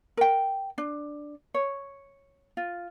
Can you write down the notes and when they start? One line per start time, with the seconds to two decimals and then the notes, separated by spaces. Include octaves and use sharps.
0.17 A#4 G5
0.78 D4
1.54 C#5
2.57 F4